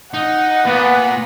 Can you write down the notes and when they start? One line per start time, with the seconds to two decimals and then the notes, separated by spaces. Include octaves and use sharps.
0.14 D#4 F#5
0.66 A#2 B3